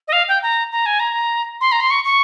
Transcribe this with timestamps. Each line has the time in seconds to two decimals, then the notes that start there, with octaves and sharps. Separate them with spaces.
0.08 D#5
0.12 F5
0.28 G5
0.42 A#5
0.72 A#5
0.86 G#5
0.99 A#5
1.61 C6
1.72 A#5
1.80 C6
1.90 C#6
2.04 C#6